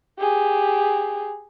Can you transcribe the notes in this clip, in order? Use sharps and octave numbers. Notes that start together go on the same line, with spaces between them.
G4 G#4